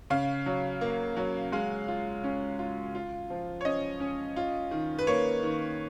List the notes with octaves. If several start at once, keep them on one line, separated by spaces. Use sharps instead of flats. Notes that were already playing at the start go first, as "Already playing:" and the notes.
C#3 F5
F#3
A#3
F#3
G#3 F5
F4
C#4
F4
F4
F3
C#5
C#4 D#5
C#4
F4
D#3
B4
A#3 C#5
D#3